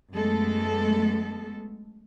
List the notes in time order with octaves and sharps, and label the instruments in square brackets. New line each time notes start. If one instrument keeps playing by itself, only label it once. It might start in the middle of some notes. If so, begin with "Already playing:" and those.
[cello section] F#2 G#3 A3 B3 A4